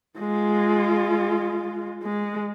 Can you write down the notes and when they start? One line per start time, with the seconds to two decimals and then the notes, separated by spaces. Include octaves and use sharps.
0.19 G#3 F4
2.03 G#3